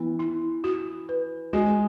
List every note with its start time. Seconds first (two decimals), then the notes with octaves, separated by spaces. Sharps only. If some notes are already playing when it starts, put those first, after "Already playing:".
Already playing: E3 B3
0.19 E4
0.64 F#4
1.09 B4
1.53 G#3 F#4